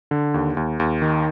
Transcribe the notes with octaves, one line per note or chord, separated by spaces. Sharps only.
D3
D#2
D#2
D#2
D#3